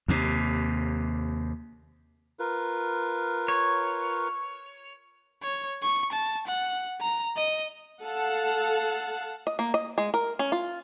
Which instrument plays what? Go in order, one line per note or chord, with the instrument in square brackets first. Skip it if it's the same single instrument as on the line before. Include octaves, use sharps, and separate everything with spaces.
[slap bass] D#2 C3
[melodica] F4 A#4 B4
[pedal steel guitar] C#5
[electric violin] C#5
C#6
A5
F#5
A#5
D#5
[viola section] A4 F5 F#5 A5
[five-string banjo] D#5
A#3
D#5
G#3
A#4
C#4
F4